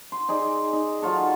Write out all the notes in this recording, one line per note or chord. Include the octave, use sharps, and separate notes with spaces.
C6
D#4 G#4 D5
D#4
F#3 F4 A4